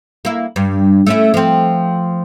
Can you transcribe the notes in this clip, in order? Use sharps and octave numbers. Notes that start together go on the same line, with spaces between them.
A#3 E4
G2
A3 C#4 E4
F3 C4